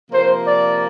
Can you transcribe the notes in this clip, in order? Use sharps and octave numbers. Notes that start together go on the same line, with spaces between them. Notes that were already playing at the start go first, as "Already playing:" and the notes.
C3 F3 A#3 C5
D5